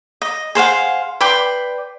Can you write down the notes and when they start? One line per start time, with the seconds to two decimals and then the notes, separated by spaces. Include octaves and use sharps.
0.22 D#5
0.55 G#4 C5 F5 F#5
1.21 B4 D5 G5 C6